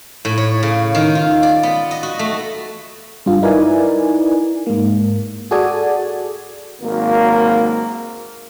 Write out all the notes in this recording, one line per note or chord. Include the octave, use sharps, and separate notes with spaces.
A2
C#5
C#3
D#3
F4
D5
B3
D#5
F#4
A3
G2 F4
D#4 E4 A#4 B4 D5 G#5
G#2 A#3
F#4 G#4 A4 D5 G#5
G#1 F#3 A#3